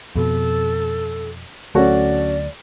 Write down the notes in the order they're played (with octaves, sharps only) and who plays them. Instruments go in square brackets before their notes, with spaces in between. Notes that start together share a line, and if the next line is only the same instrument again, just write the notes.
[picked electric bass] F2 B2 [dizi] A4
[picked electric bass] D2 F#3 A3 [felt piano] C#4 F#4 A4 [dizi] D5